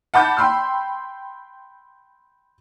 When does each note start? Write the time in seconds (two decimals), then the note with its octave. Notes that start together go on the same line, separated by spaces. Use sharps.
0.14 F#5 A5 B5 D6 G6
0.37 G5 B5 C6 E6